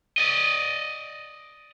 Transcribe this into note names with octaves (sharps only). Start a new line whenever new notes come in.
D5 D#5